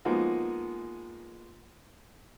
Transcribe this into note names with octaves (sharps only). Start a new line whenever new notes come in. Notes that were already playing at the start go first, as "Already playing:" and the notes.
F3 G#3 A#3 B3 D#4 F#4